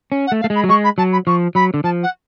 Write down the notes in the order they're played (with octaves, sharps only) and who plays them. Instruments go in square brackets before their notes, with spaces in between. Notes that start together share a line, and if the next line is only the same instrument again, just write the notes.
[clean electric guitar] C#4
[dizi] F#5
[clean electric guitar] A3
[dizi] F5
[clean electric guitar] A3
[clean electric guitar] G#3 [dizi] B5
[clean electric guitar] F#3
[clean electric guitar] G#3 [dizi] C#6
[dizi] B5
[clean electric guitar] F#3 [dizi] A5
[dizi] B5
[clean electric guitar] F3 [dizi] C#6
[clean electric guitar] F#3 [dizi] B5
[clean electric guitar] D3
[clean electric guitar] F3 [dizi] A5
[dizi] F#5